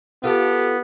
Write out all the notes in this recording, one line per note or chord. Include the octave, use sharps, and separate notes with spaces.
B3 F4 G4 A4